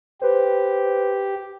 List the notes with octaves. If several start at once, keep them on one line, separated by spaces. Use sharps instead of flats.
G4 B4 C5